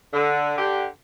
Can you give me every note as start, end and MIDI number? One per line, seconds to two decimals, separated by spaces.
0.13 0.58 50
0.58 0.85 50
0.58 0.85 67